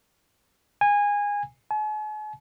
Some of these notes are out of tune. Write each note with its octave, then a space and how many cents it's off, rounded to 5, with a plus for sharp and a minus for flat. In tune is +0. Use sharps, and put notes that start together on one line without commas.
G#5 -20
G#5 +45